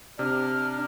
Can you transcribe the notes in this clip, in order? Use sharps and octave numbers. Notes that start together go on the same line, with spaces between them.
C3 D4 F6